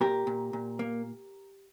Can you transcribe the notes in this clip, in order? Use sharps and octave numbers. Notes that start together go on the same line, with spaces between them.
A#2 G4 A#4
A#2
A#2
A#3